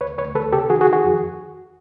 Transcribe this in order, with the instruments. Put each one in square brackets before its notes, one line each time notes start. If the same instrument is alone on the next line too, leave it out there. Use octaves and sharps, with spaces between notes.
[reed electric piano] D2 B4 C#5
D2 B4 C#5
D2 A4 B4
C3 G4 A4
D#3 F#4 G#4
F#4 G#4
D#3
F#4 G#4
F2